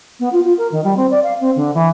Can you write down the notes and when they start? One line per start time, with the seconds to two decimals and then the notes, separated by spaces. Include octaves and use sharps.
0.19 B3
0.32 F4
0.44 F4
0.57 A#4
0.71 D#3
0.84 G3
0.96 C4
1.11 D5
1.23 F5
1.40 C4
1.56 D3
1.74 E3